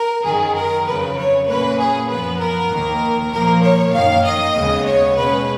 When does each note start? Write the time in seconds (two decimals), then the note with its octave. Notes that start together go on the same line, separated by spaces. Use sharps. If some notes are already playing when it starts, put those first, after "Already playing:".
Already playing: A#4
0.24 F#2 D#3 F#3 G#4
0.55 A#4
0.86 F2 C#3 F#3 B4
1.16 C#5
1.47 A#2 F#3 A#3 C#4 B4
1.78 G#4
2.09 F#2 F3 B3 B4
2.39 A#4
2.70 D#2 D#3 A#3
3.31 A#2 F3 A#3 A#4
3.62 C#5
3.92 F#2 D#3 A#3 F5
4.23 D#5
4.54 D#2 C#3 G#3 B3
4.84 C#5
5.16 B2 G#3 C#4 B4